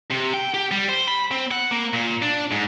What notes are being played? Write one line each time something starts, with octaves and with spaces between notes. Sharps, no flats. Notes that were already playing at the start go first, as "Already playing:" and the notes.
C3
G5
G4
G3
C5
B5
C4
F#5
A#3
A#2
D4
G#2